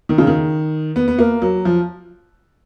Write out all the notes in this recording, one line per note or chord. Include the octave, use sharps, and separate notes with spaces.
D#3
C#3
D#3
B3
B3
A#3
F#3
F3